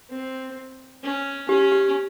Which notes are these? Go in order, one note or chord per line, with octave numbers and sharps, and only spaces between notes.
C4
C#4
C#4 G4
G4